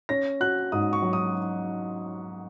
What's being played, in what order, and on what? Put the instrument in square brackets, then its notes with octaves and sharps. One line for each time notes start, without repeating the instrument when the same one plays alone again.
[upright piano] C#4 [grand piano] A#6
[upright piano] F#4 [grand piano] F#6
[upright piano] G#2 [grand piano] D#6
[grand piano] C#6
[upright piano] F#3
[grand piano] D#6